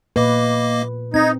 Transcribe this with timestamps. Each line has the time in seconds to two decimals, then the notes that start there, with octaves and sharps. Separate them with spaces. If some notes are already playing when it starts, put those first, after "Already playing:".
0.16 A#2 A#3 B4 D#5 D6
1.14 C4 D#4 G#6 A#6